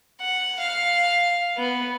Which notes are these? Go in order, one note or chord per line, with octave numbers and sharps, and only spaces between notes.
F#5
F5
B3